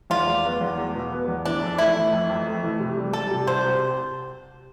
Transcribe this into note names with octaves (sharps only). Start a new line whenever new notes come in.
E2 F4
E2
B3
E2
E2
B2
B3
E2
E3 D4
F2
A3 E4
E3
F2
F2
A3
E3
C3
G3
G3 A4
C3
C2 C5
C3